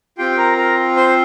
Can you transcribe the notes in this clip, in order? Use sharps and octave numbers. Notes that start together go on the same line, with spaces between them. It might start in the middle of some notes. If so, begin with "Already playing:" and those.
C4 F4 G4 G5
G5
A#4 A#5
A#4 A#5
C5 C6